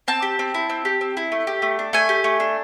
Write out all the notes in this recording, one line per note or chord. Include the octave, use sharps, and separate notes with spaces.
C4 A5
G4
C4
E4
C4
G4
C4
E4
A3
G4
A3
D4
A3 G#5
G4
A3
D4